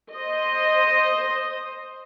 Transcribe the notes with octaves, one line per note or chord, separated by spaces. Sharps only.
C5 D#5